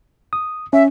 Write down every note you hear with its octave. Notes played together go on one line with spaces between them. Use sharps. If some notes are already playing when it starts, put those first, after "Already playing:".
D#6
C#4 E5